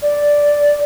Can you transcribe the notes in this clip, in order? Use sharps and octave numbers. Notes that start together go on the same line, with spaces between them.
D5